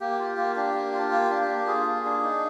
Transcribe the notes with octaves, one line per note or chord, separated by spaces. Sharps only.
A#3 G4
F4
A#3
D4 G4
A#3
F4
A#3
D4
A#3
F4 G#4
A#3
D4
D#4